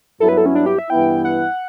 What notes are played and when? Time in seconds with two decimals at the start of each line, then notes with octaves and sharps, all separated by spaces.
0.20 G2 F#3 B3 E4 A4
0.29 B4
0.37 A4
0.46 C#4
0.55 D4
0.66 G4
0.79 E5
0.89 G2 E3 B3 E4 G5
1.25 F#5